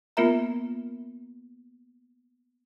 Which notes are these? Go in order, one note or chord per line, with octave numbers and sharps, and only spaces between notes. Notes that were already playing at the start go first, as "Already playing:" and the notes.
A#3 B3 F4 A#4 E5 A#5